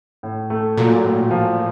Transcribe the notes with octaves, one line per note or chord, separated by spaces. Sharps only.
A2
A3
A#2 F#3
A2
F3